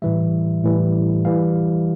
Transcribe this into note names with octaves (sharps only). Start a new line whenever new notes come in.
A2 E3 G3 E5
A2 E3 G3
E3 G3 F5